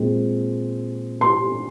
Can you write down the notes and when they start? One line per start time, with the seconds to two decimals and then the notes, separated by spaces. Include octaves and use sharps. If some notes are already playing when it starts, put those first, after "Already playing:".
Already playing: A#2 G#3 C4
1.21 C6